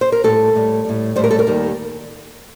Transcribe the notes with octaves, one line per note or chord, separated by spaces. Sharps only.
C5
A#4
A2 G3 A4
A2 G3
A2 G3
A2 G3 A#4 C5
A4
A#4
D#2 D#3 G3